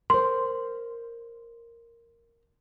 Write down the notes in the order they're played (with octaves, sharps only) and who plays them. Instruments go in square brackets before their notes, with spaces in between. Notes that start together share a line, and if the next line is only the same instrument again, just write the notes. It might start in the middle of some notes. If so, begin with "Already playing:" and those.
[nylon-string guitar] A#4 C5 [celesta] C6